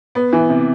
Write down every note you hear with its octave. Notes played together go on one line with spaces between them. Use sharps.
B3
E3
C3